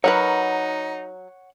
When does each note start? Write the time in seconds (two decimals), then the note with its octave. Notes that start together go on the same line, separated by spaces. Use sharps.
0.04 F#3 D#4 A#4 B4 C#5 F#5